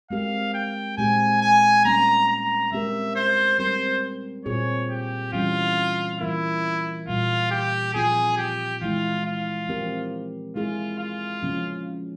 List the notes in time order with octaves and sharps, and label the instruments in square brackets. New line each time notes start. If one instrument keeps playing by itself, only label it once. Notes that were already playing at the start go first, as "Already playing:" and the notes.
[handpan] G#3 C4 G4 A#4 [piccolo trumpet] F5
[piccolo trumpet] G5
[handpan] A#2 G#3 C4 G4 [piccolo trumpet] G#5
[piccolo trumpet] G#5
[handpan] G3 A#3 C#4 [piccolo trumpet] A#5
[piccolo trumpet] A#5
[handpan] G#3 C4 G4 A#4 [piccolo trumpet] E5
[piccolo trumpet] C5
[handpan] G3 C4 G4 A#4 [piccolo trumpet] C5
[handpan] A#2 G3 C4 F4 G#4 [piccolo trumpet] C#5
[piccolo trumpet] G4
[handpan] C#3 E3 G3 C#4 [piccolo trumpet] F4
[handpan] E3 G3 A#3 F4 A#4 [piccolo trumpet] E4
[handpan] A#2 G3 A#3 [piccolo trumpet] F4
[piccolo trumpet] G4
[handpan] A#2 F3 C4 F4 [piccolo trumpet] G#4
[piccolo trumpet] G4
[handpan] E3 G#3 E4 [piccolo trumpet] F4
[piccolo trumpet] F4
[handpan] F3 C4 G4 A#4
[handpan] G#3 E4 G#4 [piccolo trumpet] F4
[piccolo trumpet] F4
[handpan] C#3 F3 A#3 C#4